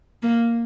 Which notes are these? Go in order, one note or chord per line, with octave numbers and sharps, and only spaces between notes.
A#3